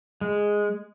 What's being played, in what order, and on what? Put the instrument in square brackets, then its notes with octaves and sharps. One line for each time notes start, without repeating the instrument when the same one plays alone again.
[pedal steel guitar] G#3